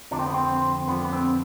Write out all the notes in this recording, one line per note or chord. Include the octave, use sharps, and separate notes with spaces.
F2 D3 F3 D4
C4
B3
C4
F2 D3 F3 B3
B3
C4